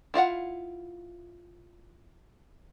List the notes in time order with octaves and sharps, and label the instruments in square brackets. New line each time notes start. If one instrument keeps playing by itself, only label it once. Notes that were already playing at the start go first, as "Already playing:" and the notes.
[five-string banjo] E4 F4 F5 F#5